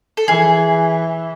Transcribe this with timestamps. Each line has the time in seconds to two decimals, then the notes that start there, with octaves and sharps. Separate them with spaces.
0.17 A4
0.28 E3 G#4